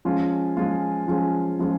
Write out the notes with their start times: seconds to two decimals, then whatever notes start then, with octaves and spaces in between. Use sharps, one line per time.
0.05 F3 G#3 C#4 F4
0.57 F3 G#3 C#4 F4
1.08 F3 G#3 C#4 F4
1.59 F3 G#3 C#4 F4